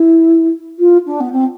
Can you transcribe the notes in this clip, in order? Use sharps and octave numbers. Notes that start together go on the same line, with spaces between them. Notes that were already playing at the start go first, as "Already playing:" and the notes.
Already playing: E4
F4
D4
B3
C4